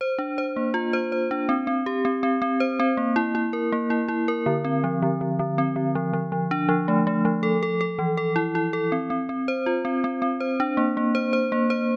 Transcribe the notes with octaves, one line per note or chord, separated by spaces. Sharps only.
C5
D4
C5
A#3
F4
C5
C5
D4
C4
C4
G4
C4
C4
C4
C5
C4
A#3
E4
E4
A#4
A#3
E4
E4
A#4
D3
C4
F3
D3
D3
D3
C4
D3
F3
F3
F3
D4
F3
A3
A3
F3
A4
A4
A4
E3
A4
E4
E4
A4
C4
C4
C4
C5
F4
C4
C4
C4
C5
D4
A#3
A#3
C5
C5
A#3
C5